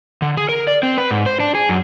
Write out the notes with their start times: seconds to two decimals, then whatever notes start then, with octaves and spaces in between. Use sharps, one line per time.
0.22 D3
0.37 G#4
0.49 A#4
0.68 D5
0.83 C4
0.98 B4
1.11 G#2
1.26 C5
1.40 D4
1.55 G#4
1.69 F#2